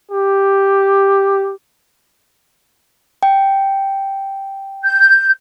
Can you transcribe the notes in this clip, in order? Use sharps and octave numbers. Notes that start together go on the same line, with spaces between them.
G4
G5
G6